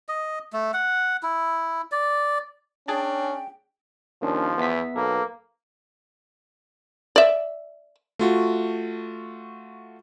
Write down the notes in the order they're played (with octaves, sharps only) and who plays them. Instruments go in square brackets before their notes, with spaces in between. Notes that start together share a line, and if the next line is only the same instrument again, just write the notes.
[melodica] D#5
A3
F#5
E4
D5
[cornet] C#4 [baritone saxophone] D4 [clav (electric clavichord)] G#4 A5 [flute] G5
[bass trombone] D#2 [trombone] F3 [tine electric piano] A#3 C#4 D4
[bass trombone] E2 [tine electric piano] B3 E5 B6
[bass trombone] B1 [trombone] A#3 [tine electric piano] A4 B4
[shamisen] D5 E5
[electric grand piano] A3 F4 F#4